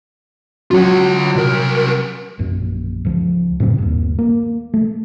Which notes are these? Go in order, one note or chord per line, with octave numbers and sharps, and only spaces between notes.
F#3 C#4 F4 F#4 C#5
C2 A#4
A#1 F#2
C#2 F3
F#2 A2 C#3 C4
G1 D#2
A#3
A3